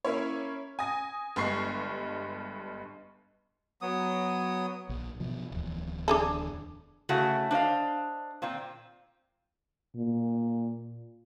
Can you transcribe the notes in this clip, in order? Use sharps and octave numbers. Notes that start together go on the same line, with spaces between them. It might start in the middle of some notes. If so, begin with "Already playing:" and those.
A#3 C#4 E4 C#5
G#5 D#6 A#6
G1 G2 G#3 C#6 C7
F#3 B3 D#6
A#1
B2 F3
D1 E2
D4 G#4 A4
C#3 A3 C#4 E4 F#4
D4 C5 D#5 F5
A#2 C4 F4
A#2